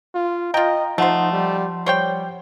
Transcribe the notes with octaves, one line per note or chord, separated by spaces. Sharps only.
F4
F4 D#5 G5 A#5
F3 A3 D#4 C5 F#5 C6
G3
G3 C5 C#5 G5